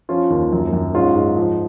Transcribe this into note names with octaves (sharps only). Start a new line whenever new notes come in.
F3 C#4 F4
D#2
F#2
F#2
G#2 C#4 F4
G#2
F3